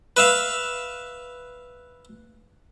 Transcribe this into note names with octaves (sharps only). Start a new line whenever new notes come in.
B4 E5 F5